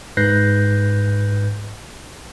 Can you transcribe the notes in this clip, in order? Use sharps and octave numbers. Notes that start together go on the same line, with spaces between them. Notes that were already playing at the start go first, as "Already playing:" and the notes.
G#2 B4 F#6 G6 A#6 C7